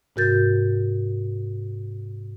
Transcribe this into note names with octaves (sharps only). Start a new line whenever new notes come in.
G#2 C3 F#4 A#4 G6 A6